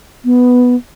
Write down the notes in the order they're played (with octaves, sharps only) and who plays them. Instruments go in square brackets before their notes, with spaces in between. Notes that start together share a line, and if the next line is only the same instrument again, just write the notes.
[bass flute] B3